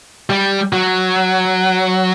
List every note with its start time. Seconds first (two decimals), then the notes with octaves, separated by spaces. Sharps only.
0.30 G3
0.73 F#3